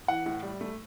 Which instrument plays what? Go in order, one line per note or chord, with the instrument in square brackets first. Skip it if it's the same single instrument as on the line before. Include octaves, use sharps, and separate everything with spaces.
[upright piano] E3 F#5
A2
G3
A3